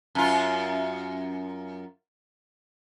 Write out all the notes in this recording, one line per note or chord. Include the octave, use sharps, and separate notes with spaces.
F#2 F4